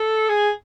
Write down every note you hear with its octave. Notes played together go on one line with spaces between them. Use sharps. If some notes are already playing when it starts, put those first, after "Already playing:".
Already playing: A4
G#4